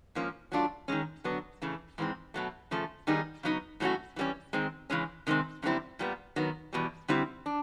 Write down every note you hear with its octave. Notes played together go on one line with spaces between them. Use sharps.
G#2 F3 A#3 C#4
F#3 A3 D4 F4
D#3 G#3 C#4
D3 F#3 B3 D4
C#3 E3 A3
G#2 E3 G#3 C4
B2 F#3 A3
C#3 F3 A3
D#3 G3 B3 D#4 G#4
C#3 F#3 B3 D#4
A2 F#3 A3 C#4 F#4
E3 G3 A#3 C#4
D#3 G#3 C4
C#3 E3 G#3 C#4
C3 D#3 G#3 C4
F#2 D3 G3 C4 E4
A#2 G3 B3
D#3 F#3 B3
E2 B2 G3
D3 G3 C4 E4 G4
D4